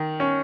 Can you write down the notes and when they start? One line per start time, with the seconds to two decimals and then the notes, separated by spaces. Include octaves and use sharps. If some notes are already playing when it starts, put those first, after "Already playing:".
Already playing: D#3
0.20 C#4